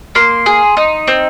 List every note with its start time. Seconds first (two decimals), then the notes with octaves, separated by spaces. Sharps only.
0.15 A#3 C6
0.46 G#4
0.77 D#4
1.08 C4